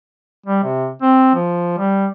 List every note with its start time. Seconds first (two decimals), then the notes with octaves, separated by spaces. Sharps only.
0.46 G3
0.64 C3
1.02 C4
1.34 F3
1.78 G3